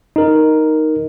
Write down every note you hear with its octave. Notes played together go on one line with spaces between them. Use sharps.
D#4 A#4